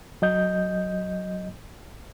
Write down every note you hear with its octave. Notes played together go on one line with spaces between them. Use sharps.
F#3 D#5 G6